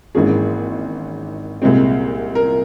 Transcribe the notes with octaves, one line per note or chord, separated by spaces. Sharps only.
G#1 G#2 E3 A#3 C#4 G#4
C2 A#2 G#3 C4
A#4